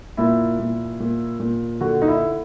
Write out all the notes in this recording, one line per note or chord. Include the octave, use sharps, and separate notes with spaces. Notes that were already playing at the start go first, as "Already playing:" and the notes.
A#2 E4
A#2
A#2
A#2
D3 F#4
D#4
E4